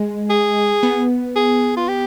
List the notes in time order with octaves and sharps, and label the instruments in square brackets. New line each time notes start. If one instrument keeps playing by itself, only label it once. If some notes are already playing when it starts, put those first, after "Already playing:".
Already playing: [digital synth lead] G#3
[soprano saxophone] G#4
[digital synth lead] B3
[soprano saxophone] G#4
F4
G4